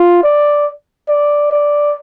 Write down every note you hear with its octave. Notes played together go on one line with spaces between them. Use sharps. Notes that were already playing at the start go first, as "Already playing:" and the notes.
Already playing: F4
D5
D5
D5